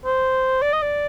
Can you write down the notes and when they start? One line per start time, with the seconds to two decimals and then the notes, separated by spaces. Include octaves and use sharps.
0.06 C5
0.62 D5
0.73 D#5
0.82 D5